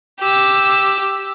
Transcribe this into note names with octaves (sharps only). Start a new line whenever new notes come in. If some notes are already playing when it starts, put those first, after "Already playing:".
G4 E6